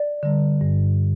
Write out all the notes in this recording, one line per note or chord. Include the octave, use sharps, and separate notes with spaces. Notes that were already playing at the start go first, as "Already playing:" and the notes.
Already playing: D5
D3 G3
G2